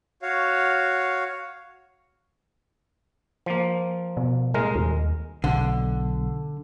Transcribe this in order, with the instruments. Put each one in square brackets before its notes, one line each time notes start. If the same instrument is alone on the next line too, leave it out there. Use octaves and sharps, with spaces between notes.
[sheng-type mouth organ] F#4 C#5 F5
[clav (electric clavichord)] F3 A#3
[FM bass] B2
[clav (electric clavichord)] C2 G#3 A#4 [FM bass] A#2
[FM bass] D#2
[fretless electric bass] B1 [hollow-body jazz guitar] D3